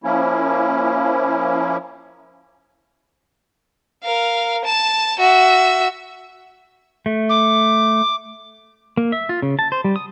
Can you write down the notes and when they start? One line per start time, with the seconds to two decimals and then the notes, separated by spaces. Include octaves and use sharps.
0.04 F3 A#3 C#4 E4
4.04 A#4 F5
4.65 A5 E7
5.20 F#4 E5
7.06 A3
7.29 D6
8.97 A#3
9.12 E5
9.29 F4
9.42 C#3
9.59 A5
9.72 C5
9.84 G3
9.96 D#6